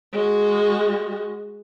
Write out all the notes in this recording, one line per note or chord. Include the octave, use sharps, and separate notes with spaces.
G#3 F#4